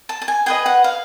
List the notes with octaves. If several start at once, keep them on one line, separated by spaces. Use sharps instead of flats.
A5
A5
G#5
G#4 B4 D#5 G5
F#5
F5